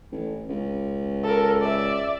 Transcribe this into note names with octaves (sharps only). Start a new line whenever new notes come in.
A1
C#2
A4 A#4
D5 E5